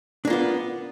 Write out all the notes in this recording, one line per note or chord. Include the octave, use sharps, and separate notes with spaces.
A#3 B3 D4 F4